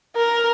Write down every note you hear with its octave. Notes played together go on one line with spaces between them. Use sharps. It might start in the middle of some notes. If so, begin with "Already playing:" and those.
A#4